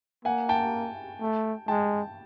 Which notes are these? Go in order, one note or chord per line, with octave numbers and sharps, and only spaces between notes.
A#3 F#5 G#5
G5 A5
A3
G#3 G5 A5